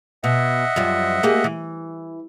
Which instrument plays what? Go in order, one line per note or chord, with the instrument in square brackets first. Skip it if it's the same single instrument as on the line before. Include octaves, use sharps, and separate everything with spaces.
[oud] B2 [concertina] D#5 E5 F#5
[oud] F#2 F3 G3
A#3 G4 G#4
E3